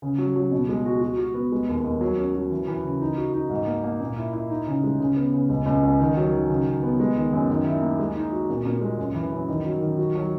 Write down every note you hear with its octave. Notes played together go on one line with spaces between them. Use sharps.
C#3
F#3
F#3
B2
G#3
F#4
F#4
F#4
B3
G#3
D#2
D#2
F#3
C#4
F#3
E3
E3
C#3
D#4
F#4
D#4
G#2
A#3
A#3
A#2
E4
E4
D#4
C#3
G#3
C#3
B3
C#3
C#2
C#2
C#2
D#3
F#3
D#3
C#3
C#3
B3
G#3
D#3
F#2
D#3
E4
A#3
G#3
D#4
F#4
A#2
A#2
G#3
F#2
E3
F#2
D#3
F#3
D#3
F#4
F#3